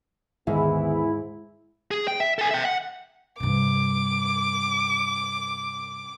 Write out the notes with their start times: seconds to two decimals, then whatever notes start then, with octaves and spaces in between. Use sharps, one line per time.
0.47 D#2 G#2 D3 D#3 B3 E4 G#4
1.91 G#4
2.08 G5
2.20 E5
2.38 A4 G#5
2.51 E5 G5
2.65 F#5
3.40 G2 C3 D6